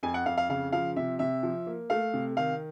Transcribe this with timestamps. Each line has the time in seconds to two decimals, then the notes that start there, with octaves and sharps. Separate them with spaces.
0.03 F2 G#5
0.14 F#5
0.26 F2 F5
0.37 F5
0.49 C#3 F5
0.72 F3 F5
0.96 C3 E5
1.19 C3 E5
1.43 F3
1.66 A#3
1.90 A3 F5
2.14 C3
2.37 D#3 F5